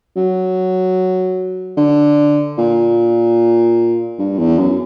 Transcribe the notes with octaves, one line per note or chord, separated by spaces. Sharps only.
F#3
D3
A#2
G2
E2
F#2